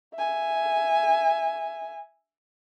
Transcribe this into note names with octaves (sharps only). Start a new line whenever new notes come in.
E5 G#5